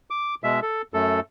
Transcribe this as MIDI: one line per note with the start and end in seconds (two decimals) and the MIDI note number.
0.10 0.35 86
0.44 0.60 47
0.44 0.60 56
0.44 0.60 76
0.62 0.82 69
0.94 1.20 42
0.94 1.20 57
0.94 1.20 69